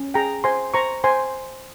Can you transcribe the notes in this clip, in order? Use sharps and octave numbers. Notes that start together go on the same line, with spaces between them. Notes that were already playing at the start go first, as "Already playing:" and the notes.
Already playing: C#4
G#4 G5 A#5
C5 G#5 C6
C5 A#5 C#6
C5 G#5 C6